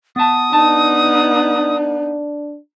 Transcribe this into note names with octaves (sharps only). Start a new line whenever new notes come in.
B3 A5 D#6
B3 D4 D#4 A5